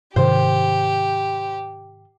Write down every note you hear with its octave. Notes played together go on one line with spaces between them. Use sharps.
G#2 C3 D#3 G4 C5